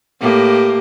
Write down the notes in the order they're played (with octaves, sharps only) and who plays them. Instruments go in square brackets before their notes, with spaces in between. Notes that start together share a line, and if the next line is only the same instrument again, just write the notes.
[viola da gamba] A2 A#3 G4